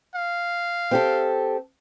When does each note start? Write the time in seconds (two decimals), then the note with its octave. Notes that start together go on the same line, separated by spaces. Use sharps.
0.15 F5
0.91 C4 G4 A4